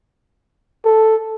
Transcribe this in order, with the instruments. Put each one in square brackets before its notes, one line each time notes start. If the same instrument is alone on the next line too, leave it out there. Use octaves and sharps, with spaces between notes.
[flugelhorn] A4